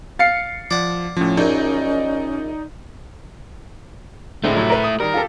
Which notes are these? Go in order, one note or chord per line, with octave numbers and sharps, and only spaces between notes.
F5 A6 C7 C#7
F3 D5 F#5
A2 F3 C#4
A#1 F#2 D#4 D5 D#5
D3 G#3 A3 C4 E4
C3 F3 F#3
A#4 B4
D#6
D#3 G3 A#4
F4 G4 A4